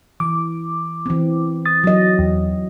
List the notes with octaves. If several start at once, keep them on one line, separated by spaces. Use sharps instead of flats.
E3 D6
E3 C4
D#6 A6
F#3 D#5
E2